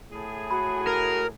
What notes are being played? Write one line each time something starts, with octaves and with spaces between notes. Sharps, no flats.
A2 G#4
F#4 B5
A#4